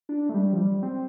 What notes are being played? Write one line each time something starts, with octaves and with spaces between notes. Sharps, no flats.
D4
A3
G3
F3
G3
C4